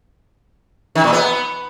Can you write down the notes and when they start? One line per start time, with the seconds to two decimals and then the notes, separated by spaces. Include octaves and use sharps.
0.95 D#3
1.04 A#2
1.13 B3